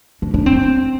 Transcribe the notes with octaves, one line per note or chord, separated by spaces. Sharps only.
D4
D4
C4